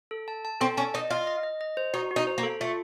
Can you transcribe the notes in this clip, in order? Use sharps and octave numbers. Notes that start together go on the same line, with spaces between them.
A4
A5
A5
C4 A4
C#4 A5
D#4 D#5
F4 D#5
D#5
D#5
D#5
C5
D#4 F#4
F#4
D#4
C5
A#3
A4
A3 F4